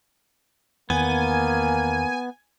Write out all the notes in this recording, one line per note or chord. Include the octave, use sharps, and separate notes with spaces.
E2 D#3 A#3 B3 G#5